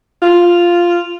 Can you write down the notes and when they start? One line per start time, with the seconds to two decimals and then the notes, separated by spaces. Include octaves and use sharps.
0.22 F4